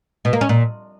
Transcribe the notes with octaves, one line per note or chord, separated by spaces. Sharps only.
B2
A#3
C#4
A#2